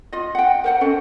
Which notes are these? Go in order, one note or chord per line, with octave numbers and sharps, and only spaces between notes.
F4 D#5
F#5 G5
A#4 C5 F#5
C#4 A4 D#5